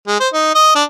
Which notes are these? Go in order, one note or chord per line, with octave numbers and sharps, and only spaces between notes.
G#3
C5
D#4
D#5
D4